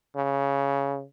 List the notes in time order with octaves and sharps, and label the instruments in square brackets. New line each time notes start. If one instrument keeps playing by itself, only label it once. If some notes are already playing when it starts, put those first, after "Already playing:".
[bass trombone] C#3